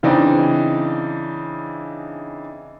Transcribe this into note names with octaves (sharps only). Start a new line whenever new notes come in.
C#3 E3 C4 D4 D#4